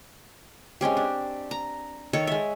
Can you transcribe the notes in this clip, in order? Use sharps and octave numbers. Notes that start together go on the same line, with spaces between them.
G#3 C4 C#4 G4
D4
A#5
D#3 A4 C#5
G#3 E5